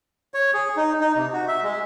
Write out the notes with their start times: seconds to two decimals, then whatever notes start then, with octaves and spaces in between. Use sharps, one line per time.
0.34 C#5
0.54 G#4
0.77 D#4
1.01 D#4
1.16 C3
1.33 F#4
1.48 E5
1.63 G#3